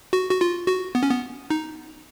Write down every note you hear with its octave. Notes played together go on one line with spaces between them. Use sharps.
F#4
F#4
F4
F#4
B3
C#4
B3
D#4